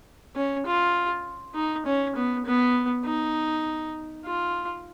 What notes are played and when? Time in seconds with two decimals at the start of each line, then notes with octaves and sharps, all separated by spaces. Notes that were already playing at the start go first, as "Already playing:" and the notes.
0.36 C#4
0.66 F4
1.55 D#4
1.86 C#4
2.16 B3
2.46 B3
3.05 D#4
4.25 F4